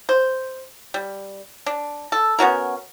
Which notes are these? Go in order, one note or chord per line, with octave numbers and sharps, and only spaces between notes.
C5
G3
D4
A4
B3 C#4 F#4 A#4